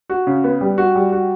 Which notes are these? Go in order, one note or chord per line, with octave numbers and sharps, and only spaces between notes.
F#4
C#3
B3
G3
F#4
G3
F#4